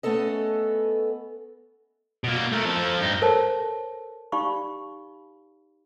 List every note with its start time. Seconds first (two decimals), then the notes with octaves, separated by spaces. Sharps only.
0.03 A3 B3 C#4 A4 D#5
2.24 B2 A#3
2.52 A3 A#4
2.65 F3 A4
3.01 G2 D#4
3.22 A4 A#4 C5 C#5 A5
4.32 D#4 G4 D5 F5 B5 C#6